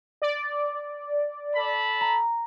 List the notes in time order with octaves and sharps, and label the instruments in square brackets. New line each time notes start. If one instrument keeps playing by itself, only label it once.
[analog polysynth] D5
[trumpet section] A4 A5 B5
[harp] A#5